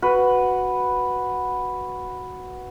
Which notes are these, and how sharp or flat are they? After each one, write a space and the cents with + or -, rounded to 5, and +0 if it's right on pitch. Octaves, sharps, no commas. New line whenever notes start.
F#4 +0 B4 +0